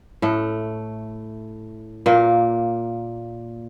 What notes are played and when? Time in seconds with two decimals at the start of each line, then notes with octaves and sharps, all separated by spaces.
0.22 A2 A3
2.06 A#2 A#3